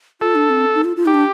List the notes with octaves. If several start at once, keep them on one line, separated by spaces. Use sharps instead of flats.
F4 A4
D4
C4
D#4
F4
F4
D#4 G4
D4